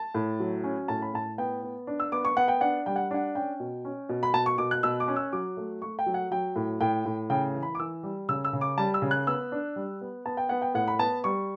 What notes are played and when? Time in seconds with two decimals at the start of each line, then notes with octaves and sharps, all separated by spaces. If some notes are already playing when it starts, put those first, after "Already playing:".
Already playing: A5
0.15 A2
0.40 F#3
0.64 C#4
0.88 A2 A5
1.02 B5
1.14 A2 A5
1.38 B3 G5
1.63 B3
1.87 D4
2.00 E6
2.12 B3 D6
2.25 C#6
2.36 B3 F#5
2.48 G5
2.61 D4 F#5
2.86 G3 G5
2.96 F#5
3.11 D4 F#5
3.35 C#4 G5
3.60 B2
3.85 C#4
4.09 B2
4.23 B5
4.34 B2 A5
4.46 C#6
4.58 B2 D6
4.71 F#6
4.83 B2 E6
5.00 D6
5.08 C#4
5.16 E6
5.33 F#3 D6
5.57 A3
5.82 A3 C#6
5.99 G5
6.06 F#3
6.14 F#5
6.31 F#3 G5
6.56 A2
6.81 A2 G5
7.05 A2
7.30 C#3 G5
7.54 E3
7.63 B5
7.75 D6
7.79 E3 E6
8.03 G3
8.29 C#3 E6
8.45 E6
8.53 C#3
8.61 D6
8.78 G3 A5
8.94 E6
9.02 C#3
9.11 F#6
9.27 B3 E6
9.52 D4
9.76 G3
10.01 B3
10.26 B3 A5
10.37 G5
10.49 B3 F#5
10.62 G5
10.74 A2 F#5
10.88 B5
10.99 B3 A5
11.24 G3 C#6